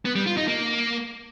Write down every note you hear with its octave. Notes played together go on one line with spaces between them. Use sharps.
B3
G3
F4
D#4
A#3